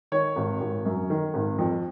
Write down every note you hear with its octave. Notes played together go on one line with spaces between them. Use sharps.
D#3 C#5
G#1
G#1
F#2
D#3
G#1
F2